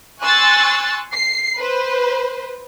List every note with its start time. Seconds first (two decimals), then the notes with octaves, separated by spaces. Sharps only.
0.22 G#5 C6 C#6 E6 F#6 A6
1.12 C7
1.57 B4 C5